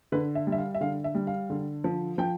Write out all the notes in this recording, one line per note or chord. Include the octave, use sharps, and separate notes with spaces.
D3 B4
E5
G3
E5
F5
E5
D3 F5
E5
G3
F5
D3
F3
F3 G5